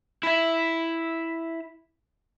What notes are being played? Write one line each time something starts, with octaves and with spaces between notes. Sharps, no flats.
E4 E5